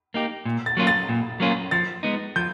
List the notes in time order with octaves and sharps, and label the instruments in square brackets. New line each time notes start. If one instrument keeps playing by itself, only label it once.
[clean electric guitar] A#3 D#4 G4
A#2
[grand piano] A6
[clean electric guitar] F#3 A#3 C#4 F4
[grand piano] A6
[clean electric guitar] A#2
F#3 A#3 C#4 F4
[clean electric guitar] F3 [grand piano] A6
[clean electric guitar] G#3 B3 D#4
[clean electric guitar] F3 [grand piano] G6